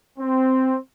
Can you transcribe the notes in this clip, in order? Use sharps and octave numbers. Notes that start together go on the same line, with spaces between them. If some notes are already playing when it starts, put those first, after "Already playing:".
C4